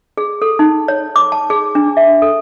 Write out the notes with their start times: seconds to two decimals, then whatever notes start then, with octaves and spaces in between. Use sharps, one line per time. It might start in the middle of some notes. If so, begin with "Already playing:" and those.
0.17 G#4
0.42 A4
0.59 D#4
0.88 C#5
1.16 D6
1.32 A5
1.50 G#4
1.75 D4
1.97 E5
2.22 A4